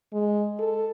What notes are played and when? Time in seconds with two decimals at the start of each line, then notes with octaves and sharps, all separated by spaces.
0.13 G#3
0.59 A4